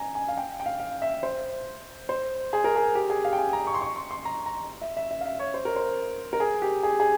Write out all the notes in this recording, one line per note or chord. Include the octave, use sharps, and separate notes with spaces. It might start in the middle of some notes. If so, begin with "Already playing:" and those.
Already playing: G#5 A#5
G#5
F5
G5
G5
F5
F5
E5
C5
C5
G#4
A#4
G#4
G4
G#4
F5
G5
G#5
A#5
C#6
C6
C#6
C6
C6
A#5
A#5
E5
E5
E5
F5
E5
C#5
C5
A#4
C5
A#4
G#4
G4
G#4
G#4